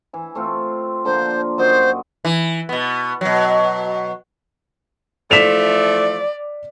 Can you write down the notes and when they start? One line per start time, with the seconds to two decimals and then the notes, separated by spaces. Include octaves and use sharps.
0.13 E3 G#5
0.35 A3 C4 F4
1.05 D3 F3 A#3 C5
1.58 F#2 F#4 C5 D#5
2.25 E3
2.69 B2 B3
3.21 B2 F#3
5.31 E3 F3 A3 D5 B6 E7 F7